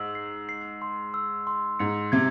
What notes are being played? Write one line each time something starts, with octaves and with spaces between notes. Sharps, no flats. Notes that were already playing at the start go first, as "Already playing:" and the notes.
Already playing: G#2 E6 F#7
C7
C7
C6
E6
C6
G#2 C#7
C3 G#6